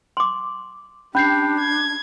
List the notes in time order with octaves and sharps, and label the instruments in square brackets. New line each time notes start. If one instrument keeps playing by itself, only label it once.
[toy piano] C6 D6
[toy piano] C#4 [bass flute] D4 [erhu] G4 [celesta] B5 G6 C7
[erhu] G#6